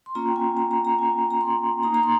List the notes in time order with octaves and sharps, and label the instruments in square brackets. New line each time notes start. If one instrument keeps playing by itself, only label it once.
[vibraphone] C6
A#3 C#4 F4 A#5
G5
G#5
A#5
A#5
A#5
G#5
A#5
C6
A#3 D#4 A#5
A#5
C6